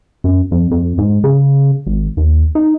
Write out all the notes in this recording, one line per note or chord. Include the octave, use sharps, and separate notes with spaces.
F#2
F2
F2
G#2
C#3
G#1
D#2
D#4